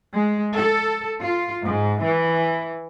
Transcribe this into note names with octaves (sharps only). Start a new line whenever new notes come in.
G#3
A4
F4
G#2
E3